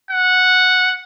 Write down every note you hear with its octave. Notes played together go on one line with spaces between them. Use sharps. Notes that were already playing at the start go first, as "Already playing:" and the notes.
F#5